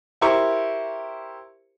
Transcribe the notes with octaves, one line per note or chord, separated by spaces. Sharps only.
E4 G4 A#4 C5 C#6